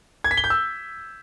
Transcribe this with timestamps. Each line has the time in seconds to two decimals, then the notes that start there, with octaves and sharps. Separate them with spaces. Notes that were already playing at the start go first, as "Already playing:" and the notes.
0.24 G#6
0.31 B6
0.37 G7
0.44 G6
0.50 E6